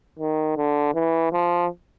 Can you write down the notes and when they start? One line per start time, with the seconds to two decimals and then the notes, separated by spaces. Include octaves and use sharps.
0.19 D#3
0.57 D3
0.95 E3
1.33 F3